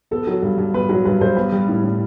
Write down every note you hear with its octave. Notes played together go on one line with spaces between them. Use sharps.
B3 A4
F#3
G2
G2
B3 B4
F#3 B4
G2 B4
G2 C5
B3 B4
G3
A2
A2